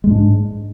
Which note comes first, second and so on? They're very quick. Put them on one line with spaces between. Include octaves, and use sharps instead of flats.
G#3 G#2 D4